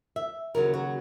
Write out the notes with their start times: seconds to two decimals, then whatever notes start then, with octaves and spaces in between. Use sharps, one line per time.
0.16 E5
0.55 D#2 C#3 F#3 A#4
0.74 F#4